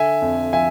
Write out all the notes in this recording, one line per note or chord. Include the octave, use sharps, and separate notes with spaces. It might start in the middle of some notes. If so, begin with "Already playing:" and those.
Already playing: D3 E5 G#5
F2
F3 E5 G#5